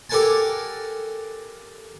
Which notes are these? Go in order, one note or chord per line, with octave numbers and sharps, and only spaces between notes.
G4 A4 A#4 F#5 G#5 A5